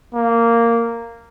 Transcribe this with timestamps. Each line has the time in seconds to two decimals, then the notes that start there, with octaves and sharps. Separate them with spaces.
0.15 A#3